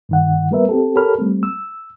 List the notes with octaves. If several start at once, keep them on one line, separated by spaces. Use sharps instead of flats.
G2 D#3 F#5
G3 A#3 B3 A#4 B4 E5
C4 G4 A4
G4 A4 A#4 C#5 B5 F6
G3 A3 C4
E6